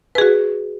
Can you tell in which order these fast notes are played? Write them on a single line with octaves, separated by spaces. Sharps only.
B4 G#4 F#4